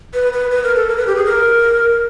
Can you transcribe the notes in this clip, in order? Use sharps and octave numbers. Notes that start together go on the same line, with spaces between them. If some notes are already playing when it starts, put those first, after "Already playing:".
B4
B4
B4
A#4
A4
A#4
B4
G4
G#4
A#4